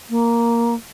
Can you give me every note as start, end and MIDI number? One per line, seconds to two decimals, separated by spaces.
0.09 0.74 58